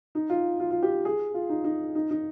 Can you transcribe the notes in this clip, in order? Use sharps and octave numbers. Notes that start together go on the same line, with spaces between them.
D#4
F4
F4
F4
G4
G#4
F4
D#4
D#4
D#4
D#4